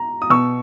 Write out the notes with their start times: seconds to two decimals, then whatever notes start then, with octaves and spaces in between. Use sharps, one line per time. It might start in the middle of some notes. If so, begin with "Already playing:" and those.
Already playing: A#5
0.22 D#6
0.30 B2 C#6 E6